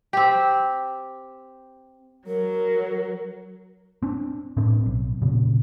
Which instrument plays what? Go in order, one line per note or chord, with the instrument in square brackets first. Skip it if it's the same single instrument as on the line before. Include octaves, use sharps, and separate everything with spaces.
[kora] C4 G4
[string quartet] F#3 [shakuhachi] A#4
[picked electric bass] C4 D4
A2 C4 D4
B1
F1 A#2 C#3